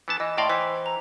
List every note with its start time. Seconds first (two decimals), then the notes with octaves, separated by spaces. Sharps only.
0.08 E3 B3 A5
0.20 E3 D#5
0.38 A2 D5 D#5 F5 G5 C6
0.49 E3 C5 B6
0.86 A#5